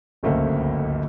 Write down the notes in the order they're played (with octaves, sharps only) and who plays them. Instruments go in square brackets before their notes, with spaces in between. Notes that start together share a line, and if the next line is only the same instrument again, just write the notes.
[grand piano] D1 G1 C#2 A3 A#3 C5